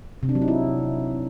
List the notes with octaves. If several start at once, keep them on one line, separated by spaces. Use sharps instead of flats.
C3
D4
F#3
D#4
E4